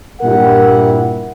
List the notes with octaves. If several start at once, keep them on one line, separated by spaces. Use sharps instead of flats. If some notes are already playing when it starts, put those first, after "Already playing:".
G2 A#2 E4 G4 A#4 F#5